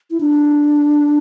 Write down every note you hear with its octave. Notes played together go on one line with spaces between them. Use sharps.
E4
D4